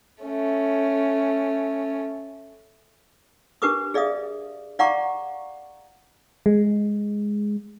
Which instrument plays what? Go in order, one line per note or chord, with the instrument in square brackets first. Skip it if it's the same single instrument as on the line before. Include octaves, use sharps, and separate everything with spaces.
[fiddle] A3 C#4
[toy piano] D4 G4 A#4 B4 D6 D#6
G#4 D5 E5 F5 D#6
D5 F5 F#5 A#5 C#6 D6
[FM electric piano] G#3